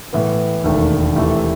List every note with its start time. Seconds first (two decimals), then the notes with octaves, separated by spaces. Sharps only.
0.13 A2 E3 B3
0.64 E1 D#2 D#3 A3
1.16 C3 E3 A3 E4